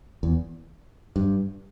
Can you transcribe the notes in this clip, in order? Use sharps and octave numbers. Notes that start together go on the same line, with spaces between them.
E2
G2